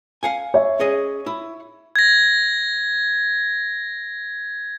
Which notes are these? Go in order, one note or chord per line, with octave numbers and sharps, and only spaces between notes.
F5 F#5 G#5
C#5 E5
C#4 G#4 D#5
E4
G#6 A#6